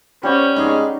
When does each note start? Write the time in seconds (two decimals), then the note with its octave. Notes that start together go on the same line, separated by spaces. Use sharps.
0.23 G3 C#4 F#4 C5 G5
0.57 G#2 D#4 G#4